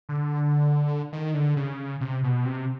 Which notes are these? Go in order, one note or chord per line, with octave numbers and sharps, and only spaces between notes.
D3
D#3
D3
C#3
C3
B2
C3